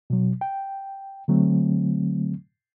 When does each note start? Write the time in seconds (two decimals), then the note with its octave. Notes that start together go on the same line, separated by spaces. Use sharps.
0.10 B2 F#3
0.41 G5
1.28 D3 F#3 A3 C4